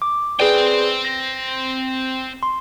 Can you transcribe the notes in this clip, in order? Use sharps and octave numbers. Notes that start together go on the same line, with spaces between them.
D6
C4 G#4 B4 D5 G5
A#6
C6